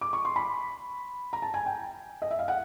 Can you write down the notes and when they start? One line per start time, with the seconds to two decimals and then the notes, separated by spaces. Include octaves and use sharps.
0.01 D6
0.13 C#6
0.25 C6
0.36 B5
1.33 A#5
1.42 A5
1.54 G#5
1.66 G5
2.22 D#5
2.31 E5
2.39 F5
2.48 F#5